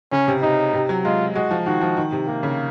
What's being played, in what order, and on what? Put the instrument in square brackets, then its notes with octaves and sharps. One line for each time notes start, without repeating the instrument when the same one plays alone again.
[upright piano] C#3 [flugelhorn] C#4
[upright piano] C3
[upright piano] C3 [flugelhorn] D#4
[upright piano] C3
F#3
[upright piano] G#3 [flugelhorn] F4
[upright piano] G#3 [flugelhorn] F#4
[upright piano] F3
[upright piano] D#3 [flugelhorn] F#4
[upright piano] F3
D#3
C3
[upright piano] C3 [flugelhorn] A#3
[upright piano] C#3